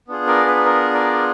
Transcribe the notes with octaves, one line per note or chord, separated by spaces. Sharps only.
B3 D4 F4 G#4
A#4 D5
B4
A#4
A#4 D5